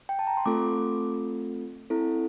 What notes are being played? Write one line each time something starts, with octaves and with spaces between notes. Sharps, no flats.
G5
A5
A#5
C6
A3 C4 F4 A4 D6
C4 E4 A4